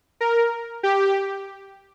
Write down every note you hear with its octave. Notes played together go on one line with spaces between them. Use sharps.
A#4
G4